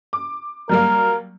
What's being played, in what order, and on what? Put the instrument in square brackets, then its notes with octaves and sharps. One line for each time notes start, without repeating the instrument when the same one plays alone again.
[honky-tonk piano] D6
[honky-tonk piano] F#3 G3 A#3 [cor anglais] A#4